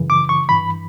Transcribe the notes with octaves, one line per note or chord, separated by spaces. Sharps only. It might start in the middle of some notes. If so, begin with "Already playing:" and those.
Already playing: F#2 C#3 E3
D6
C#6
G2 E3 B5